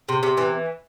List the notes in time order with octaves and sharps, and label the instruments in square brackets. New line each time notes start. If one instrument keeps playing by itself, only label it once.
[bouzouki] C3
C3
E3